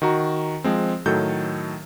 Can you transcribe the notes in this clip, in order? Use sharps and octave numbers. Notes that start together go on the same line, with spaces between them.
D#3 F#4 A#5
F3 G#3 C4
A2 D#3 F#3 A4 G6